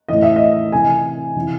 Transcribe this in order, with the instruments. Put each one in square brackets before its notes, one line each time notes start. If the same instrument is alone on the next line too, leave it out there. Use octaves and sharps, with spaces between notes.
[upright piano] A2 E3 D#5
E5
D#5
C3 E3 G#5
C3 E3